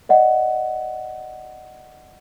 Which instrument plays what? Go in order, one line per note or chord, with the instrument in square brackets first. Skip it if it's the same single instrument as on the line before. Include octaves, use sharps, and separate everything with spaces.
[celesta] D5 D#5 F#5